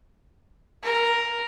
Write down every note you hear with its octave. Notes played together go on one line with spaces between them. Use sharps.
A#4